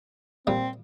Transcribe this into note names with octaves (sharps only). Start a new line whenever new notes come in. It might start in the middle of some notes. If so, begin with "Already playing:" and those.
A#2 G3 A#3 C4